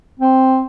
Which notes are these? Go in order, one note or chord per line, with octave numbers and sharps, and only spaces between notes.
C4